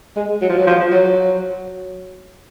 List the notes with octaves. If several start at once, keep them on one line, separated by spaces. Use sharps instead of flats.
G#3
F#3
F3
F#3
F3
F#3